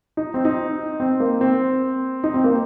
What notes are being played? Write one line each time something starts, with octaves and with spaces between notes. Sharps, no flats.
D#4
C4
D#4
C4
A#3
C4
D#4
C4
A#3